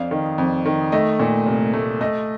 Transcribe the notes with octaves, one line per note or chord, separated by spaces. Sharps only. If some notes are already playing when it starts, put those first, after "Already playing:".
Already playing: F2 D4 F5
D#3
F2
D#3
A3 D#5
A#2
C2
A3
A3 D#5